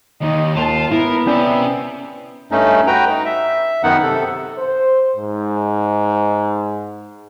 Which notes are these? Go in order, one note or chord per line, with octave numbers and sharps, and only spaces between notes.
D#2 D#4
D#2 F4 A5
B3 E4 A#4
C4 C#4 D5 E5
G2 A3 C#4 D#4
F#4 B4 G5 A#5
D#4
E5
F#2 D#3 B3 D#4 F#5
C3 A4
C5
G#2